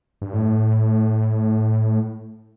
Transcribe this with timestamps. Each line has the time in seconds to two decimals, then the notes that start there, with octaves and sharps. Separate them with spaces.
0.22 G2
0.33 A2